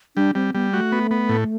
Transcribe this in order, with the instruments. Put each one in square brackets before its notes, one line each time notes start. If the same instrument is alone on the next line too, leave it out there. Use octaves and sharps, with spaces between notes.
[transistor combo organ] G3 [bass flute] D4
[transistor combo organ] G3 [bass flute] C4
[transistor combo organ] G3 [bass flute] B3
[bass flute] A3 [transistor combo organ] F#4
[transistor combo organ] B3
B3
A2